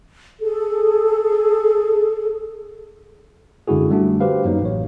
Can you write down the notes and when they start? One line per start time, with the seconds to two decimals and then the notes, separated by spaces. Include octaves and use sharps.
0.41 G#4 A4
3.68 F#2 D3 G#3 E4 F#4 G#4
3.90 G3 A3 D4 F#4
4.20 G4 B4 C5 F5
4.45 F#2 F#3 A#3 D#4
4.62 A1 C#5